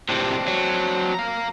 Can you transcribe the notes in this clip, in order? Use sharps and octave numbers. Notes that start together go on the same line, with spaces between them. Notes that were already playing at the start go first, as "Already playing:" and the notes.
A2 C3 C4 D4
F#3
F5 A#5